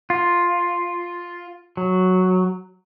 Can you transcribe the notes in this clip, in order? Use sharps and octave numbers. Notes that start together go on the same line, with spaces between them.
F4
F#3